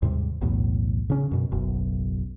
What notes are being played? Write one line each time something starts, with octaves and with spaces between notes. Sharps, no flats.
D#2 G#2 C3 G3
B1 E2 A2
C#3 C#4
F#2 B2
F#1 B1 F#2